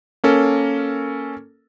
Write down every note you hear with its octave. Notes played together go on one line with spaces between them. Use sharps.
A#3 C#4 A4 A#4